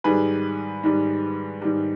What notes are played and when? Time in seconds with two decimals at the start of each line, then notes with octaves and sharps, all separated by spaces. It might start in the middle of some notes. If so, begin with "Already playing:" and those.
0.04 G#2 D#3 G3 G#4 B4
0.84 G#2 D#3 G3
1.62 G#2 D#3 G3